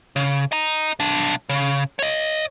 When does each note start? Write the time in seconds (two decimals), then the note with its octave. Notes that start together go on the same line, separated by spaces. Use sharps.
0.16 C#3
0.52 D#5 A#5
1.00 B1 D4
1.49 C#3
1.99 C#5 D#5